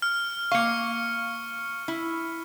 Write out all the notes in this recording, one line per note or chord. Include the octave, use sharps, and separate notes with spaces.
F6
A#3 F5 C#6 C#7
E4